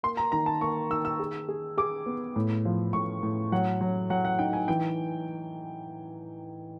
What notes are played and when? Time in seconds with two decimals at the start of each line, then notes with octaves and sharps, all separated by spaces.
0.03 A#3 C6
0.17 A#5
0.32 D#3 A#5
0.46 A5
0.61 A#3 C#6
0.90 D#3 E6
1.05 E6
1.19 G#4
1.49 G#4
1.77 G#4 D6
2.06 B3
2.36 A2
2.65 F3
2.93 A2 C#6
3.23 A2
3.52 F#3 F#5
3.81 F#3
4.10 F#3 F#5
4.25 F#5
4.39 D#4 G5
4.53 G#5
4.68 E3 G5